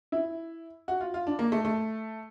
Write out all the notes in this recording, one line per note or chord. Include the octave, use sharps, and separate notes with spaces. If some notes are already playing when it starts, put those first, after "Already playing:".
E4
F#4
F4
F4
D4
A#3
A3
A3